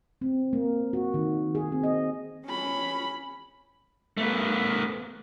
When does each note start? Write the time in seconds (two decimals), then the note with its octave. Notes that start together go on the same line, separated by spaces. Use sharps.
0.21 C4
0.53 A#3
0.93 F#4
1.14 D#3
1.55 G#4
1.72 C4
1.83 D#5
2.46 C#4 B5
4.17 A3 B3